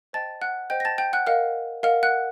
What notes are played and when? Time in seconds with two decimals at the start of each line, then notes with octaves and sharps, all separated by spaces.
0.13 C5 D#5 G5 A5 A6
0.42 F#5 F#6
0.70 C5 D#5 G5 G6
0.80 A#6
0.85 A5 A6
0.98 G5 G6
1.13 F#5 F#6
1.27 A#4 D#5 F5 F#5 F6
1.83 A#4 D#5 F5 F#5 F6
2.03 F#5 F#6